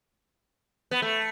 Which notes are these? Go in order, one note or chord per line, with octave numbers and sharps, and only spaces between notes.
B3
A3